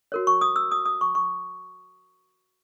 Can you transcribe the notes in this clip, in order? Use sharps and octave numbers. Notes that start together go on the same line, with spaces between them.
F#4 A#4 C#5
C#6
D#6
E6
D#6
D#6
C#6
C#6